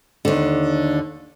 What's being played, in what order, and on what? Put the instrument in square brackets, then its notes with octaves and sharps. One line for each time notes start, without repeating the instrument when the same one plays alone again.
[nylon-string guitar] D#2 D3